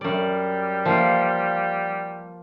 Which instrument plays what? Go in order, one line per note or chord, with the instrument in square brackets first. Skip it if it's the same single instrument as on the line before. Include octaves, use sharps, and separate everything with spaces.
[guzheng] F#2 D5 [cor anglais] G3
[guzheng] F3 A#3 F4